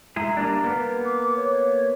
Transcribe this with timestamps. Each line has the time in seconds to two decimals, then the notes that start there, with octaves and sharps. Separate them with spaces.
0.16 G#3 E4 G#4 A#5
0.37 G3 A#3 D4
0.64 A#3 B3
1.05 D6
1.36 C#5